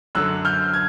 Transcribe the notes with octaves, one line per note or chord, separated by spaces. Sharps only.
F#2 D3 F#3 E6 F#6
F6 G6
G#6